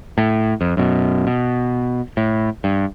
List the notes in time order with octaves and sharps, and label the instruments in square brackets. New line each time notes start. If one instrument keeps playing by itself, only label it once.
[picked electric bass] A2
F2
F#2 B2
B2
A2
G2